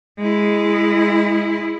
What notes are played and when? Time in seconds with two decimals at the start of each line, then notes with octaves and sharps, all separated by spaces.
0.19 G#3 E4